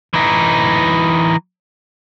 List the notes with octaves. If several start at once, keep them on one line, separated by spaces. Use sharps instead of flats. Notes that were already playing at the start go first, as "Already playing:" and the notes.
E3 D#4